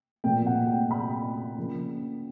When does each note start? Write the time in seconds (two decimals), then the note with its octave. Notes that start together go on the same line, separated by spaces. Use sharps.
0.24 A#2 F3 A3 G5
0.46 F#5
0.68 G5
0.91 B5
1.57 C#3 F3 A#3